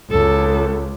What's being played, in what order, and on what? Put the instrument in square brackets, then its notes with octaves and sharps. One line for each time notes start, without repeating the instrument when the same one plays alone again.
[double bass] C#2 [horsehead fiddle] A4